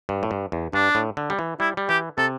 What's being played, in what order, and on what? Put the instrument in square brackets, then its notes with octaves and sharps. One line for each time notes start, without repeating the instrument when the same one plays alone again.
[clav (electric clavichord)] G2
A2
G2
E2
[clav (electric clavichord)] G2 [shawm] D4
[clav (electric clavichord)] A2
D3
G3
E3
[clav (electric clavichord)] G3 [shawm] E4
[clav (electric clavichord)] G3
[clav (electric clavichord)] E3 [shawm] G4
[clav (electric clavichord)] C3 [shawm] A4